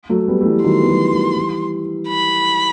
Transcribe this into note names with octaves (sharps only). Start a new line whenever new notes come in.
F#3 A3
G3 B3
A3
E3 G3
D#3 F#3 C6
B3
F#3 A3
D#3 F#3
E3 G3
B5